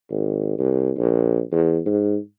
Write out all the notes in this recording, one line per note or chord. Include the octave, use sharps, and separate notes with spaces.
G#1
C2
A#1
E2
G#2